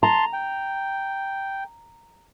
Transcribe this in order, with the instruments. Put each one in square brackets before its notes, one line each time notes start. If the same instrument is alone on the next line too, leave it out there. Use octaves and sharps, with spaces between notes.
[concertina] A5 C6 [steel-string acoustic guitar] A#5
[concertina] G5